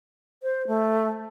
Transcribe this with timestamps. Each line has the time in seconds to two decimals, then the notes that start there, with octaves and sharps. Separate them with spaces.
0.43 C5
0.67 A3